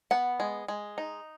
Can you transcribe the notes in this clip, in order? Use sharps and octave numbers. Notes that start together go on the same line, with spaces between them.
B3 F#5
G#3
G#3
D#4